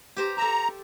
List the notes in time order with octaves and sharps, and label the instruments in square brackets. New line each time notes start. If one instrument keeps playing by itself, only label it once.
[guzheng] G4 C5 A#5
[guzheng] A4 E5 [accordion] A#5